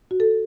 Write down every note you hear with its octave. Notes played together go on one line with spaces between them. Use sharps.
F#4
A4